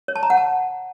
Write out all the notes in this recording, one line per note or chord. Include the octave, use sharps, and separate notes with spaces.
C#5
A5
A#5
F#5
A5